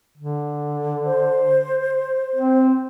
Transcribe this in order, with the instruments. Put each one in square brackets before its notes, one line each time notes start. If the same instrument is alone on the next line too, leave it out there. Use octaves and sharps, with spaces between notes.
[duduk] D3
[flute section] C5
[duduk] C4